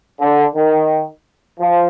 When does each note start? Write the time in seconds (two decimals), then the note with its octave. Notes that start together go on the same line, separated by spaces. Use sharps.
0.20 D3
0.55 D#3
1.60 F3